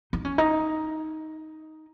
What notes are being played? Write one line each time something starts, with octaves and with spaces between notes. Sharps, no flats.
D#4
C#4
D#4